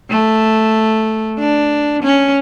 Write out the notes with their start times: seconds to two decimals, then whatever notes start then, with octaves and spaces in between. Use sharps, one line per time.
0.10 A3
1.39 D4
2.03 C#4